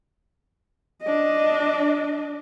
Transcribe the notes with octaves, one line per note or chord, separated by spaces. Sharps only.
D4 D#5